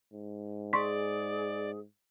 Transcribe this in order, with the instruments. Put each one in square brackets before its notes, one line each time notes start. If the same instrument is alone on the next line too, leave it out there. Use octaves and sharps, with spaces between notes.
[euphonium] G#2
[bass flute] G#4 [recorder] D5 [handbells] C6 C#6 B6